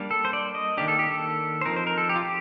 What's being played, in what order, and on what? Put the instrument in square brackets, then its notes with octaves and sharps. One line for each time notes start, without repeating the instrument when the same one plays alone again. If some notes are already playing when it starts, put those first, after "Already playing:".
Already playing: [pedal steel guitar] G3 A#3 D4
A4
C5
D5
D#5
D#3 A#3 D4 G4
A4
G4
A4
C5
F3 C4 D#4 A#4
C5
A#4
A4
G4
F4
G4